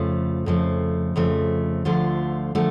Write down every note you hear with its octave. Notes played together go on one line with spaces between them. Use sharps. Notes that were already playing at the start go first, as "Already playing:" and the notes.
Already playing: F2 C#3 F3 A3
F2 C#3 F3 A3
F2 C#3 F3 A3
D2 D3 F3 A3 F4
D3 F3 A3